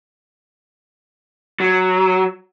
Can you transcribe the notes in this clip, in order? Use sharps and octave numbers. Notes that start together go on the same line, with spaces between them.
F#3